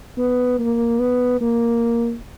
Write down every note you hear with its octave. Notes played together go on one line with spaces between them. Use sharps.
B3
A#3
B3
A#3